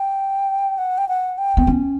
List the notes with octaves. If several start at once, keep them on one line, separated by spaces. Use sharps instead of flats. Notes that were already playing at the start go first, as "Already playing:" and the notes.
Already playing: G5
F#5
G5
F#5
G5
B3
C#4